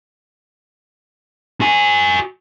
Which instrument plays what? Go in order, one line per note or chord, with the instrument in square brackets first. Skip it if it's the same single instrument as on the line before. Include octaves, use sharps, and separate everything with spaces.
[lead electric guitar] F#4 G#5